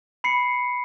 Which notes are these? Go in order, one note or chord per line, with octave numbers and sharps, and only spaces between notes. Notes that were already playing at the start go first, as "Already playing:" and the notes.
B5 C7 C#7